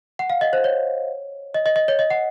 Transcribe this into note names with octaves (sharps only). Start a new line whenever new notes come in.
F#5
F5
D#5
C5
C#5
D#5
D#5
D#5
C#5
D#5
F#5